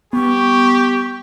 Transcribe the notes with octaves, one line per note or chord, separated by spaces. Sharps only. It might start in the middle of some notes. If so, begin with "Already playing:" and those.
G3 B3 G4 C#6